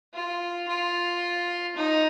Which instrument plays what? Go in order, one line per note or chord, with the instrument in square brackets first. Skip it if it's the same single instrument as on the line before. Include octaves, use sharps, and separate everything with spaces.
[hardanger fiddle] F4
F4
D#4